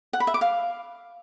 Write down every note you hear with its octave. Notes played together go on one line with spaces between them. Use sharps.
F#5
B5
E5
D6
F5